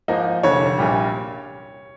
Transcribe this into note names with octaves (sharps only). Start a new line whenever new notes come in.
G#2 F3 A#3 D#4
F1 F2 D3 C#5
A#1 A#2 G3